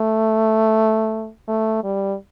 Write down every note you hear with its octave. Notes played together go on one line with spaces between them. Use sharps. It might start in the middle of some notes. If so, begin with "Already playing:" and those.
Already playing: A3
A3
G3